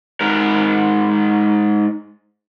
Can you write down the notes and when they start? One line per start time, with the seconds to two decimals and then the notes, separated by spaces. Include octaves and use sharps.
0.21 G#2 A#4